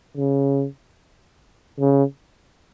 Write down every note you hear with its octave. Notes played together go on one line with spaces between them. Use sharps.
C#3
C#3